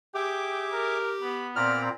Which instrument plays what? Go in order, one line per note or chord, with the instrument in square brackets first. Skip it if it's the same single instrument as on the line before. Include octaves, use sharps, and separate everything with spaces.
[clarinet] G4 [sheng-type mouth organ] G#4 E5 D6 [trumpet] G5
[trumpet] A#4
[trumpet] B3 [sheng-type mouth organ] B5
[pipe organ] A#2 C4 [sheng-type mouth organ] D5 A#5 B5 [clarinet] F6